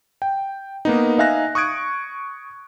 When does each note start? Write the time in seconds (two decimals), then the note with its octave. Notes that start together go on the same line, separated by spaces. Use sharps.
0.22 G5
0.85 A#3 B3 D#4
1.18 D#4 E5 F5 G#5 F#6 A#6
1.55 C#6 D#6 F#6 G#6 D7